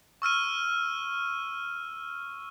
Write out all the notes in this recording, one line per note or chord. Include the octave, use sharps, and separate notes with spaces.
C#6 E6 F6 D#7